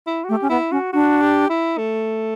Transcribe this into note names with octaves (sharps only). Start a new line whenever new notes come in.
E4
F#4
A3 G4
C#4
B3 E4
C#4 F#4
D4 F#4
G4
E4
A3